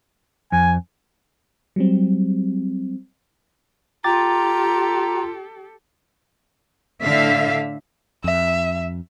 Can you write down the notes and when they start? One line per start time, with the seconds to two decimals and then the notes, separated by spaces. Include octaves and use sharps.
0.52 F2 G#5
1.76 F#3 G3 C4
4.04 F4 G4 A4 G5 A#5 D6 A6
7.03 A2 D3 E5 F5
8.24 F2 E5